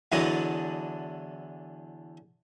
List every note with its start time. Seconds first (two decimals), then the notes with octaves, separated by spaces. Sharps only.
0.12 E2 D3 E3 F#3 D4 D#5